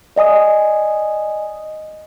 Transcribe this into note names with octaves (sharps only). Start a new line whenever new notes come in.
D5 D#5 G#5 D#6